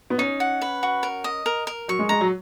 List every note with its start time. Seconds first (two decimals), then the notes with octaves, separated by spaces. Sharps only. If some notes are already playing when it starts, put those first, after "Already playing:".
0.10 B3
0.18 C#4 D#4
0.40 F#5
0.61 B4
0.83 F#4
1.03 A#4
1.24 D#5
1.46 A#4
1.67 A#4
1.88 F#3 C#6
1.99 G#3
2.09 G#3 A#5
2.21 F#3